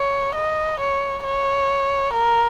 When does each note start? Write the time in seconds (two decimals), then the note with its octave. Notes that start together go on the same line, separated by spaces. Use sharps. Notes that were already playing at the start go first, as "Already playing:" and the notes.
Already playing: C#5
0.35 D#5
0.80 C#5
1.24 C#5
2.13 A#4